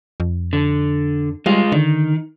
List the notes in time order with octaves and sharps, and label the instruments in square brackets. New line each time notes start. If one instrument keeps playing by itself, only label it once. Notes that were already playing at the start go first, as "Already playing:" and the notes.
[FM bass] F2
[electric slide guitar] D3
[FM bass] G3 [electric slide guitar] G#3 F4
[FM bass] D3 [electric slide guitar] D#3